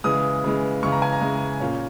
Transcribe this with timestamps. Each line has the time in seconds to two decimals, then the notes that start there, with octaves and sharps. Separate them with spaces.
0.04 C#3 E3 G#3 D#6
0.44 C#3 E3 G#3
0.83 C#3 E3 G#3 C#6
0.92 A#5
1.02 G#5
1.13 A#5
1.21 C#3 E3 G#3
1.60 A#2 A#3 C#4